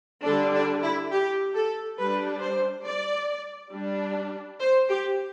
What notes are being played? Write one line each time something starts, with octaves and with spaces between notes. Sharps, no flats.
D3 G3 D4 A4
D4
E4
G4
A4
G3 D4 B4
C5
D5
G3 D4
C5
G4